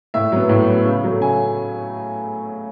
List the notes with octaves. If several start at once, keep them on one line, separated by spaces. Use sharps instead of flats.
A2 E5
F#3 B3
A2
F#3 B3
C#3
F#3 A3
C#3 G#5